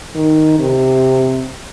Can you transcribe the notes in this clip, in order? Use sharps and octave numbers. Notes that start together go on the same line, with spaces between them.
D#3
C3